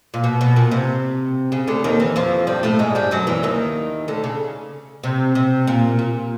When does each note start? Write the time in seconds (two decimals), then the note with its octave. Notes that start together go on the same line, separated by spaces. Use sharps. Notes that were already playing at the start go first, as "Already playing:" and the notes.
0.14 A#2
0.24 B2
0.41 B2
0.56 A#2
0.72 C3
1.52 C#3
1.67 D2 D3
1.84 D#2 D#3
2.00 E2 E3
2.16 F2 F3
2.47 G2 G3
2.63 A2 A3
2.79 G#2 G#3
2.95 G2 G3
3.11 F#2 F#3
3.27 E2 E3
3.43 D#2 D#3
4.08 D2 D3
4.24 C#3
5.04 C3
5.35 C3
5.67 A#2
5.99 A#2